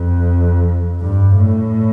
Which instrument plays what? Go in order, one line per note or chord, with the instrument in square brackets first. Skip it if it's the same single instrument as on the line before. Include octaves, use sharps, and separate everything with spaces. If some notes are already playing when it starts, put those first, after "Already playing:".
Already playing: [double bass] F2
G2
A2